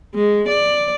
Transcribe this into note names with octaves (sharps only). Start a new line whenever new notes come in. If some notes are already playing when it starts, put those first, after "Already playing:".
G#3
D5